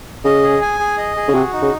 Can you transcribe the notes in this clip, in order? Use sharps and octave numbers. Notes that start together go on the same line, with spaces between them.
C#3 D#5
G#4
G#5
G#4
D#5
G#4
C#3
C3 F#4
D#4
C#3